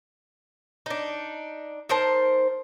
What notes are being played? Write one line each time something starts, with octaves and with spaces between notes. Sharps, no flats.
D4 D#4
D#4 A#4 C5 A5